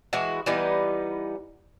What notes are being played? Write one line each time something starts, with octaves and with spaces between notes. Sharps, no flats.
E3 G#3 E4 F#4
E3 G3 B3 D#4